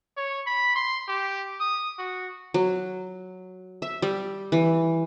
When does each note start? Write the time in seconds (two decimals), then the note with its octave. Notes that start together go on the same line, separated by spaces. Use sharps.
0.16 C#5
0.46 B5
0.76 C6
1.08 G4
1.60 D#6
1.99 F#4
2.54 F#3
3.82 E5
4.02 G3
4.52 E3